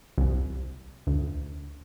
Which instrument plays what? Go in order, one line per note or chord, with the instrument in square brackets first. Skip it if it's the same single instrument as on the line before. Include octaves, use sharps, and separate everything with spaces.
[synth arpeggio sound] C2
D2